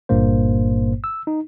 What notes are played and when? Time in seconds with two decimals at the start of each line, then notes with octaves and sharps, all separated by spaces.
0.09 G1 G2 A#2 A#3 C5
1.04 E6
1.27 D#4